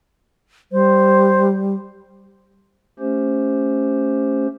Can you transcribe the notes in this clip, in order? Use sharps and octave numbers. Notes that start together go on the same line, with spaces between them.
G3 C5
A3 C#4 G4 C5